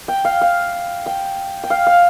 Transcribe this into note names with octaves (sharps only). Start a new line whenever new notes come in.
G5
F5
F5
G5
G5
F5
F5